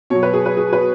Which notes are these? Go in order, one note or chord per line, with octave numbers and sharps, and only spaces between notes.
B2 F#3 C#5
B4
G#4
B4
G#4
B4